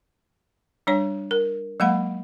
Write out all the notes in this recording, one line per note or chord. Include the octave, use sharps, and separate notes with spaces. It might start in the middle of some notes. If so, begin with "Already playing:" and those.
G3 D4 C#5
A#4
F#3 G#3 A#3 F5 F#5 B5